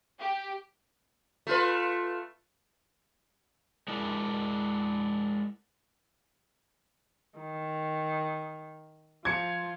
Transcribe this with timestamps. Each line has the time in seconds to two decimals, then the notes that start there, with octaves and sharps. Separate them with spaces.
0.19 G4
1.47 A3 F4 B4
3.88 G#3 D4 E4 A#4
7.39 D#3
9.25 F3 F4 G#6 C#7